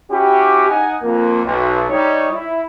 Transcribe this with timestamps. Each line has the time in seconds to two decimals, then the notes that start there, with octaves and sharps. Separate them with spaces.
0.10 C#4 E4 F#4 G4
0.69 D#4 D#5 F#5 G#5
1.03 F2 A#3
1.45 B1
1.89 G3 D#4 C#5
2.32 E4